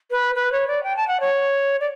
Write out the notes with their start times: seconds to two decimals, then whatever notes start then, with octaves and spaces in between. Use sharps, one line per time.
0.11 B4
0.35 B4
0.52 C#5
0.67 D5
0.83 G5
0.96 A5
1.07 F#5
1.20 C#5
1.80 D5